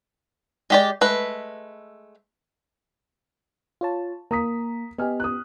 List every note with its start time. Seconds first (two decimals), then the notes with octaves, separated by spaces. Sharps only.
0.70 G#3 G4 D5
1.01 G#3 A3 B4
3.81 F4 C#5 A5
4.31 A#3 A#5 D#6 B6
4.98 B3 G4 D#5 G#5 F6
5.20 D#6 F#6